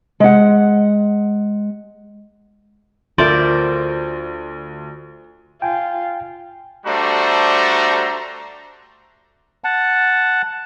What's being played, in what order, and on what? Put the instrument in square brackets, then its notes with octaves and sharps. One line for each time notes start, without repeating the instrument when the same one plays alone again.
[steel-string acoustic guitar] G#3 F#5
[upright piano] D2 [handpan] F4 E5 [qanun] A#4 D5 [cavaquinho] C5
[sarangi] F4 [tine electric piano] G5 G#5
[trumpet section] G3 A3 D4 F#4 C5 A#5
[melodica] F#5 A5